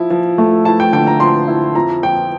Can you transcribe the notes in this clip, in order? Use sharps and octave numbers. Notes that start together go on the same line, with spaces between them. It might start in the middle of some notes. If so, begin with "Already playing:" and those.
Already playing: F3 E4
F3
A3
E4 A5
G5
D3 G5
A#5
F3 C6
E4
F2 A#5
F2 G5